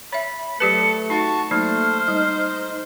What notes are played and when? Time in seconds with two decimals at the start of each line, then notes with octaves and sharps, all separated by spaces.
0.13 C#5 E5 B5
0.60 F#3 A3 G4 A4 B4 C#7
1.10 D#4 F#4 A5
1.51 F#3 A3 A#3 D#4 C5 F6
2.08 G3 D#4